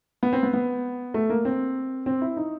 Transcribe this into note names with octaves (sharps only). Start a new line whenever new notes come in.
B3
C4
B3
B3
A3
A#3
C4
C4
E4
D#4